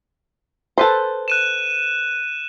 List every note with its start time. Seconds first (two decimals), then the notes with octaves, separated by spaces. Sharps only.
0.78 A4 B4 C5
1.28 F#6 D#7 E7